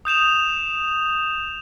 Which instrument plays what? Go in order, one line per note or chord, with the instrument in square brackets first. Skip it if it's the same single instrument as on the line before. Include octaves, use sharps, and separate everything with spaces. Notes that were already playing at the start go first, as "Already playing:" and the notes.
[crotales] D#6 G6 E7 F7